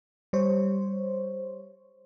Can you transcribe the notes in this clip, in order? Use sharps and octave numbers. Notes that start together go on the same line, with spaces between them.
G3 C5 C#5